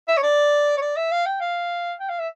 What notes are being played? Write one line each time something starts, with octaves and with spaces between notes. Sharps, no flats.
E5
C#5
D5
C#5
D5
E5
F5
G5
F5
G5
F5
E5